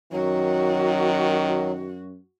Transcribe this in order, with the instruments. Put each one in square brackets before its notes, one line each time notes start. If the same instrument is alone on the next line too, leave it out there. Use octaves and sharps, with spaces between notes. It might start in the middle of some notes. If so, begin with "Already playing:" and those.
[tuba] F#2 [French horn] D#3 [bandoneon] F#3 [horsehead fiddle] F#4